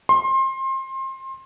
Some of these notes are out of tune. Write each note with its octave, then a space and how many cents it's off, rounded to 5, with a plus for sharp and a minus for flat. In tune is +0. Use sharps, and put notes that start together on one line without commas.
C6 +30